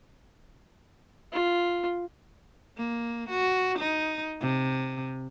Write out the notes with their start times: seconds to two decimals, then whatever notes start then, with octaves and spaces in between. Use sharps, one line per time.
1.33 F4
2.77 A#3
3.30 F#4
3.79 D#4
4.41 C3